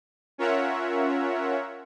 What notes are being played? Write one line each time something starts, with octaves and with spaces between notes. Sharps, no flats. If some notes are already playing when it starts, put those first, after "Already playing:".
C#4 F4 A#4 C#5 E5 F#5